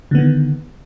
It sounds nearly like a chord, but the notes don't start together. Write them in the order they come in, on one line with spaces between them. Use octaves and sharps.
D3 B3 D#3